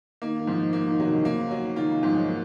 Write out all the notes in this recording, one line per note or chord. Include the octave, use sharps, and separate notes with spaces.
D#3 A#3
D#3
G#2 F3
A#3
D#3
C3 F#3
D#3
C#3
F3
D#3 A#3
C#3
F#3
C#3
D#3 F4
C#3
G#2 F3
G#3
F#3
A#3